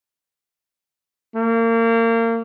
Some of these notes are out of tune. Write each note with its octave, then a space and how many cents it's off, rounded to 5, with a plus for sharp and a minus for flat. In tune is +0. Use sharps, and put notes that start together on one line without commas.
A#3 -30